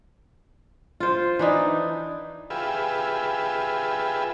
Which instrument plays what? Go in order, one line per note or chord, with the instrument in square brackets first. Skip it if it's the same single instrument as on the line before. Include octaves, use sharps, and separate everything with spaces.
[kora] F4 C5
E3 D4 D#4
[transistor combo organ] F4 G4 G#4 B4 E5